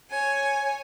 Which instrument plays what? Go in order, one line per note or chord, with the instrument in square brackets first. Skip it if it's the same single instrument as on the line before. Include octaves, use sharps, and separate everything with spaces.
[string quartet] C#5 G#5